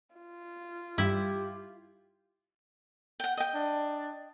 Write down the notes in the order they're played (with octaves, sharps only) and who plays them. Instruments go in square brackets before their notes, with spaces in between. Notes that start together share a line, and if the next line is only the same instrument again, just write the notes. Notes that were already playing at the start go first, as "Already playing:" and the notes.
[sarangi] F4
[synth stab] G2 G3 [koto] E4 [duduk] G4
[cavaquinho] F#5 G5
D#5 G5
[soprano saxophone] D4